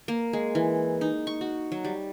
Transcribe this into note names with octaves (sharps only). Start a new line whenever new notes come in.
A#3
G#3
E3
D#4
C#6
F#4
F#3
G3